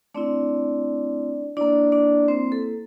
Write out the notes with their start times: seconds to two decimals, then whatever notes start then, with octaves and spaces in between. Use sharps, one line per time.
0.14 A3 C4 D4 E4 D5
1.57 A#3 D4 E4 D5
1.92 D4 D5
2.28 C4 C5
2.52 A4